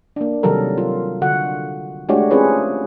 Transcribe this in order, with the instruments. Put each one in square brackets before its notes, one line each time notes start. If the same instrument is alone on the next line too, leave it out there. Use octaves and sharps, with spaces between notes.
[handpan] A#3 D4
C3 D#3 F#3 G3 A4 A#4
F4
D3 F#4 F#5
G#3 A3 D4 F#4 G4 C#5
C4 C#4 F4 G#4 B4 C#5